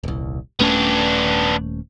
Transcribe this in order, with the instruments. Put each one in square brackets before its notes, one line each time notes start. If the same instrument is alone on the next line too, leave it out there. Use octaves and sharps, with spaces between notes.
[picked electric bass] D#1 C2
[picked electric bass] D#1 A3 C#4 [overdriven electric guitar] B3 D4